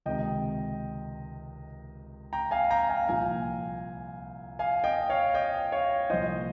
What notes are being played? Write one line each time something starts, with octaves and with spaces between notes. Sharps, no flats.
C#2 C3 D#3 D#5 G5
G5 A#5
F5 G#5
G5 A#5
F5 G#5
C2 A#2 F3 F5 G#5
F5 G#5
D#5 G5
C#5 F5
D#5 G5
C#5 F5
C2 A#2 F3 C5 D#5